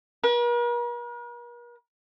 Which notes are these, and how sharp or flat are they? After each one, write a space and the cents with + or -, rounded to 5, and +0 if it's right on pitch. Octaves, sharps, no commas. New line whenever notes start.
A#4 +45